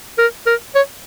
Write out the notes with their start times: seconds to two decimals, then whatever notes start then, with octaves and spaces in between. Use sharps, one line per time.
0.18 A#4
0.46 A#4
0.75 C#5